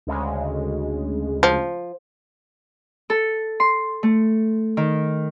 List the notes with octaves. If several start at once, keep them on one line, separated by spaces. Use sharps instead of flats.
D2 C#3 G#3
F3
A4
C6
A3
D#3